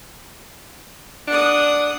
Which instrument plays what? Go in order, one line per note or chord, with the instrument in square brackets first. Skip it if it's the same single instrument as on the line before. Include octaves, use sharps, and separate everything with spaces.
[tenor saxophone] D4 [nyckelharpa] F#5 D#6